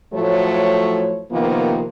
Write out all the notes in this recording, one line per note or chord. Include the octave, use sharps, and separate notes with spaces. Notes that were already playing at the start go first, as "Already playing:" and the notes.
A2 F3 F#3 A3 C#5
C3 D#3 F3 A#3 B3